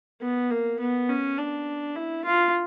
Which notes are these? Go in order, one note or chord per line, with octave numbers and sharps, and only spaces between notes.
B3
A#3
B3
C#4
D4
E4
F4